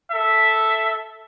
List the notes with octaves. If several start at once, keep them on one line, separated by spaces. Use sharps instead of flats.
A4 E5